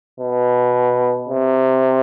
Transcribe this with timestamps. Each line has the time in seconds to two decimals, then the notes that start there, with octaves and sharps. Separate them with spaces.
0.20 B2
1.29 C3